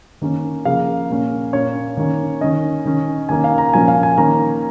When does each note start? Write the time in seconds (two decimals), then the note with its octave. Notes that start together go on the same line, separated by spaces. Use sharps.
0.22 D#3 A#3 C#4
0.65 C#3 F3 A#3 F5
1.09 A#2 A#3 C#4
1.53 A#2 A#3 C#4 C#5
1.97 D#3 A#3 C#4
2.41 D#3 C#4 D#5
2.85 D#3 C#4
3.29 D#3 A#3 C#4 G#5
3.44 F5
3.58 A#5
3.73 A#2 F3 A#3 C#4 G#5
3.88 F5
4.03 G#5
4.17 D#3 A#3 C#4 A#5